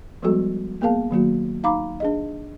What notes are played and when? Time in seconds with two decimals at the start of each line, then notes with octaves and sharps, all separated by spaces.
0.23 F3 G3 G#3 B3 F#4 A4
0.81 A#3 B3 G#4 A#4 F5 A5
1.11 D#3 F#3 A#3 F#4
1.64 D#4 F5 A#5 B5 D6
2.00 D4 G#4 D#5